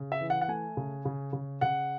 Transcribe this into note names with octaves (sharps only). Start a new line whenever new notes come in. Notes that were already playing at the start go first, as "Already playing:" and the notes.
Already playing: C#3
E5
E3
F#5
F#5
A3 G#5
C#3
C#3
C#3
C#3 F#5